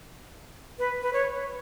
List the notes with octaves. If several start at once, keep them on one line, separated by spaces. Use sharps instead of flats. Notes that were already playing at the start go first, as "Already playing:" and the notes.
B4
B4
C#5